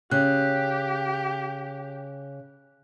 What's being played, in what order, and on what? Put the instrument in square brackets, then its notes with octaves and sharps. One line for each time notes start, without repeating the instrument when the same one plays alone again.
[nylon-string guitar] C#3 [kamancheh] G4 [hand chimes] F#6